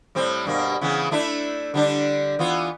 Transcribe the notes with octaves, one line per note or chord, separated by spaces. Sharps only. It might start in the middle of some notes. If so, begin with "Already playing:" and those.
A2 G3 C4
G2 B2 A#3
C#3 E3 B3
A3 D4 E4
D3 G3 D4
E3 B3 F4